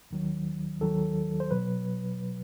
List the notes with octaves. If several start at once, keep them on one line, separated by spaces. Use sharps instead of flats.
D#2 D#3 F#3
D#2 D#3 F#3 A4
C5
B2 F#3 B4